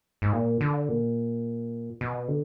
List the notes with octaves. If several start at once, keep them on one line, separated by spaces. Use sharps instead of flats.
G#2
A#2
D3
A#2
B2
D3